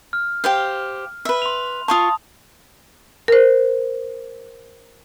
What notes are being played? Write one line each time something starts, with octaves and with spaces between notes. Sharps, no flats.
F6
G4 C5 F5
B4 E5
C6 F7
F4 F5 A5 C#6 D#6
A#4 C5